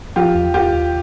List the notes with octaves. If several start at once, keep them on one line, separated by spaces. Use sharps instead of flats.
F3 F4 G4
E2
D#2 F4 G4
D#2